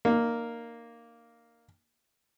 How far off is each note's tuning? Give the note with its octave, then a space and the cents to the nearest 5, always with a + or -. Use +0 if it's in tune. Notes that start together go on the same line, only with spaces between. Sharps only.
A#3 +0 D#4 -35